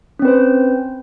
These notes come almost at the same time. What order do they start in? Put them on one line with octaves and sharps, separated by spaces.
C#4 C4 B4 C5